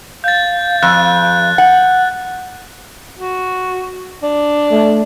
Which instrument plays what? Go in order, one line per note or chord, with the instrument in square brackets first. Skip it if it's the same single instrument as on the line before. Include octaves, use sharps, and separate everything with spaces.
[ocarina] F5 [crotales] G6 A6
[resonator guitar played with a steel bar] F2 [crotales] F#6
[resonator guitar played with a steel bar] F#5
[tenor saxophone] F#4
D4
[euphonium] A3